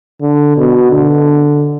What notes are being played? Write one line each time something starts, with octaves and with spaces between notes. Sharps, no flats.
D3
B2
D3